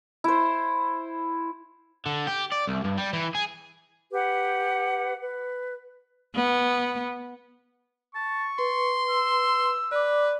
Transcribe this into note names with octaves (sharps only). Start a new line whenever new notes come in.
E4 C5
D3
G4
D5
C2
G2
G3
E3
G#4
G4 B4 F#5
B4
B3
A5 C#6
B4 C6
E6
B4 D5 D6